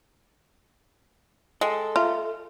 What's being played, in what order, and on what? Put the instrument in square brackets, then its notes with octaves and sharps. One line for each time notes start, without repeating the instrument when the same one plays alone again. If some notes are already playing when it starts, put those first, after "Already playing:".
[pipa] G#3 [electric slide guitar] A4 [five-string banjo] G5
[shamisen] F4 [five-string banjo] E5 A#5